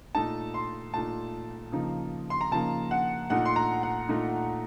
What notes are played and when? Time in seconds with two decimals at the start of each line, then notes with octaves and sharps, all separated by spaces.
0.15 A#2 A3 D#4 A5
0.54 C6
0.94 A#2 A3 D#4 A5
1.72 C#3 F3 A#3 D#4
2.30 C6
2.41 A#5
2.51 C#3 F3 A#3 D#4 A5
2.91 F#5
3.30 A#2 A3 D#4 F#5
3.45 C6
3.56 A#5
3.83 F#5
4.09 A#2 A3 D#4